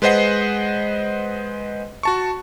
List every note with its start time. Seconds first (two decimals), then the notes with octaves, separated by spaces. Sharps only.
0.02 G#3 B4 C5 D#5 F#5 C7
2.03 F#4 A5 C#6